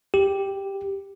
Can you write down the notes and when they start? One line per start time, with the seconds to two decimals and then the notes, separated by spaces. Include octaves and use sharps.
0.14 G4